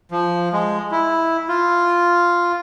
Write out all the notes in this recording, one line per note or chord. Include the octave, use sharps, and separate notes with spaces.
F3
G#3
E4
F4